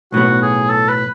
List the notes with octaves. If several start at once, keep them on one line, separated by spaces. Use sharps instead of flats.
B1 A2 F#3 B3 F#4
G#4
A4
B4